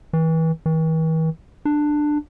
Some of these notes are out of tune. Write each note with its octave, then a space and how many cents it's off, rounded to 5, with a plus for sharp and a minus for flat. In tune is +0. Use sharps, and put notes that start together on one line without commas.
E3 -30
E3 -45
D4 +15